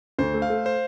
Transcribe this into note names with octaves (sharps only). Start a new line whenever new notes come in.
D2 C5
A3
F5
A3
C5